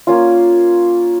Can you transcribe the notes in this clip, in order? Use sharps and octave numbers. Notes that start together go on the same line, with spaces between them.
A#3 C#4 F4